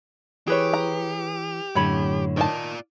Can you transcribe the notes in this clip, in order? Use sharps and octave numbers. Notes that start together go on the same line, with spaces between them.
E3 G4 G#4 B4 C#5
A#5
F#2 A2 D3 C#5 B5
D#3 F4 D5 A5